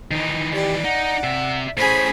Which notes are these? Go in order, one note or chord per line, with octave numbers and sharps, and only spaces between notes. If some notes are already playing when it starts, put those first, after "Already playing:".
D#3 E3 D#4
G4 D5
D#4 F#5
C3 E5
A2 C#4 G#4 C5 B5